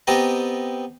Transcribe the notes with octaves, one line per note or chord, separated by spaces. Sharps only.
B3 C4 G4 D#5 A5 A#5